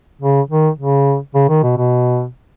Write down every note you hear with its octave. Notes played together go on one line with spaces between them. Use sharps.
C#3
D#3
C#3
C#3
D#3
B2
B2